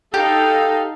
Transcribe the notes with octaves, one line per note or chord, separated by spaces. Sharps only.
D#4 G4 A4 F5